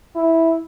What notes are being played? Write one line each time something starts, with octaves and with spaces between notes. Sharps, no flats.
E4